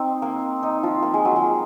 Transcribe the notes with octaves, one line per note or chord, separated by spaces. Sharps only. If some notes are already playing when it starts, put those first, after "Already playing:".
Already playing: C4 D#4
A#3
D#4
F3 F4
A#3
G#3
F#3
G#3